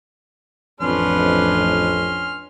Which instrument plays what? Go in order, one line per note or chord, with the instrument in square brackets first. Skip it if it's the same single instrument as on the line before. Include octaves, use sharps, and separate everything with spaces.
[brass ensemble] A1 F2 [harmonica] C#4 C6 F6 [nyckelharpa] D4 B4